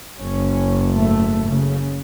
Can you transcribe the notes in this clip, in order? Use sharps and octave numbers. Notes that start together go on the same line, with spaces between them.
F#1 C#4
G#2 A3
C#3